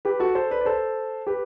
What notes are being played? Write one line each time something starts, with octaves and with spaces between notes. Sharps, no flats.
G4 B4
F#4 A4
A4 C5
B4 D5
D5
A4 C5
G4 B4